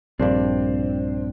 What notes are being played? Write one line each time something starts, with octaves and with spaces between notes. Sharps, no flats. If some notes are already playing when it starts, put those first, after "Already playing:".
A#1 G2 C4 D4